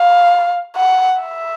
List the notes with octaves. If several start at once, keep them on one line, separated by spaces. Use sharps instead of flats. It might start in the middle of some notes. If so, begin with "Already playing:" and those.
Already playing: F5
F#5
E5